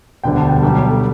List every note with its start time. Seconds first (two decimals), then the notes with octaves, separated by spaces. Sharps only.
0.24 E1 D2 D3 G3 B3 G5
0.37 A5
0.49 G5
0.62 B1 B2 G3 B3 G5
0.75 C#5
0.89 A4